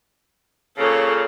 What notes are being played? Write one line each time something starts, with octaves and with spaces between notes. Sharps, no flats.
A#2 C#3 A4 C#5